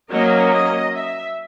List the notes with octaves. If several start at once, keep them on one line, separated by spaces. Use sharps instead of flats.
F#3 A#3 C#4 D#5
D#5
E5